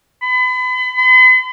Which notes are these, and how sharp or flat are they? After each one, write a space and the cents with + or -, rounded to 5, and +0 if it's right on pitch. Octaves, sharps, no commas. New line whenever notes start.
B5 +35
B5 +45